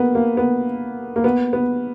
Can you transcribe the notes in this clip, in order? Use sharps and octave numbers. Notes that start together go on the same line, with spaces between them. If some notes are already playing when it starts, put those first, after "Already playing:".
Already playing: A#3 B3
A#3
B3
A#3
B3
B3